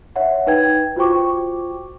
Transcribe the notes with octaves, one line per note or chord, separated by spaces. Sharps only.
C#5 E5 F#5
D#4 B4 G5 G#6
F4 F#4 C5 G5 C#6 D6